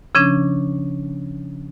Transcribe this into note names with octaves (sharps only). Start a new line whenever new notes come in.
C#3 F3 C#4 D4